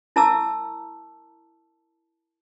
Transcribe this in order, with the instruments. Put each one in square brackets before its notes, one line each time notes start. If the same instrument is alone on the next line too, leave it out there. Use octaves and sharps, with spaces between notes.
[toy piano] E4 A#4 A5 A#5 D6 E6